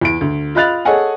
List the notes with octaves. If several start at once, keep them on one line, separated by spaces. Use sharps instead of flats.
E2 D7
D2
F4 D#5 B5 F#6 A6 F7
G#4 A4 C#5 D#5 F#5 G#5